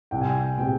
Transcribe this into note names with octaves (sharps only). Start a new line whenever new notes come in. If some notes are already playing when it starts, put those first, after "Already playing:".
C2 G5
G#5
G5
A#2 G#3 C4 G4 G5